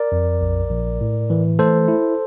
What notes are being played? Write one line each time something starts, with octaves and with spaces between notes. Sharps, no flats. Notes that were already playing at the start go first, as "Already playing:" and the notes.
Already playing: A#4 D5
F2
A#1
A#1
A2
E3
A3 A4 C5
E4